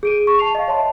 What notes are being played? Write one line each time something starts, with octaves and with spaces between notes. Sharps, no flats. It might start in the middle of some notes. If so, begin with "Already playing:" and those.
G#4 D7 D#7
C#6
A5 C7 F7
D#5 F5
C#5 E5 A5 C6